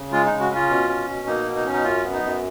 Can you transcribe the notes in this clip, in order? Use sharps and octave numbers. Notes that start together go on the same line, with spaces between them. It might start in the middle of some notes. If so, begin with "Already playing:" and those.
Already playing: C#3
G#3 F4
C#3 D#4
F#4
C#4 F4
B2
C#4
B2
A#3 D#4
B2
D#4
C#4
D#4
F#2 F4
B3
D#4
F#2